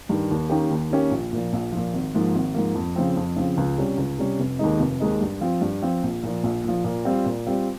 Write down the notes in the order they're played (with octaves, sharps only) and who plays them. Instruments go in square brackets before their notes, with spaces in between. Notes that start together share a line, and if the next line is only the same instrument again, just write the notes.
[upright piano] G2 D#3
D#2
D#3 A#3 C#4 G4
D#2
D#3 A#3 C#4 G4
A#1
A#2 F3
A#1
A#2 F3
G#1
G#2 F3 A#3
G#1
G#2 F3 A#3
F2
C#3 F3 C4
F2
C#3 F3 C4
C#2
C3 G3 C#4
C#2
C3 G3 C#4
F1
D#2 D#3 G#3 D#4
F1
D#2 D#3 G#3 D#4
G2
F3 C4 F4
G2
F3 C4 F4
A#1
A#2 F3
A#1
A#2 F3
A#2
G3 C4 F4
A#2
G3 C4 F4